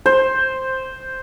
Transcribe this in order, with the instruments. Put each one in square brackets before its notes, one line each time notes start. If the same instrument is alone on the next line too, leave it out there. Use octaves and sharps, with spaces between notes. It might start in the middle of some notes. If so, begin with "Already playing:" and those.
[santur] C5